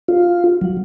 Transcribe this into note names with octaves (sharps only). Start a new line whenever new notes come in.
F4
F#3